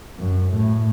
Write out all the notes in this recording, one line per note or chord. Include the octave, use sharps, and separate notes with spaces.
F#2
A2